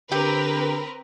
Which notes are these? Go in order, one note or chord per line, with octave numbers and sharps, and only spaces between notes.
D3 C4 G4 A#4 B4